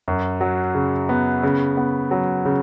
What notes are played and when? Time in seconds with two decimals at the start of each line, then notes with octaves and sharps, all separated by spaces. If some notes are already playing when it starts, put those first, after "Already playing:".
0.08 F#2
0.41 F#3
0.75 C#3
1.09 B3
1.43 C#3
1.77 B3
2.11 F#3
2.45 C#3